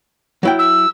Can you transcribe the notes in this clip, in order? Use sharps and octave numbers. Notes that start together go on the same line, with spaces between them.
F#3 E4 G5
E6